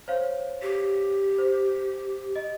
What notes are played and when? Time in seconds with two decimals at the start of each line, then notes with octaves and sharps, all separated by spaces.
0.08 C5 C#5 F5
0.62 G4
1.38 C5
2.36 D#5